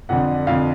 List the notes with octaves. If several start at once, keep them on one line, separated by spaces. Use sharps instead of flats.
F2 D3 F#5
F2 D3 F5